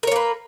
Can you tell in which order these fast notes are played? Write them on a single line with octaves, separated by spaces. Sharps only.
A#4 C#5 A#3 B4